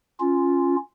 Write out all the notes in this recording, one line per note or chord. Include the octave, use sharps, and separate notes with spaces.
C#4 F4